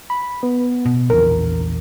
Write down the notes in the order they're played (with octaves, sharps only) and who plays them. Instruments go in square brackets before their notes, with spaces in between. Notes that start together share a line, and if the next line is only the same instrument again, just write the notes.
[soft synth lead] B5
B3
[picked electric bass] B2
[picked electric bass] A#1 E2 [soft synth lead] A#4